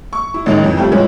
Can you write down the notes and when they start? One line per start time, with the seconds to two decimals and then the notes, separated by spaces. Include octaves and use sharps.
0.13 C#6
0.34 E4
0.46 A1 D#3 G#3 D#4 F7
0.63 F2 E3
0.77 G3 A3 C4 F4
0.92 A2 E3 F3 G#3 C#4 E4